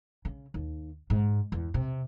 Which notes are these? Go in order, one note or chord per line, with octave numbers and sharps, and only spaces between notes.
C#3
D#2
G#2
E2
C3